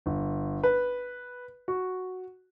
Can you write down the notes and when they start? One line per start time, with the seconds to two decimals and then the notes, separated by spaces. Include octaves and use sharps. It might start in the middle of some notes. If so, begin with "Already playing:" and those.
0.06 G1
0.63 B4
1.68 F#4